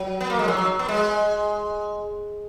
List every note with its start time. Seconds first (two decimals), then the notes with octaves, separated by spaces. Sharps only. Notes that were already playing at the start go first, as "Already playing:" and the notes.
Already playing: F#3
0.20 B3
0.30 A#3
0.39 G#3
0.48 F#3
0.58 F#3
0.79 B3
0.88 G#3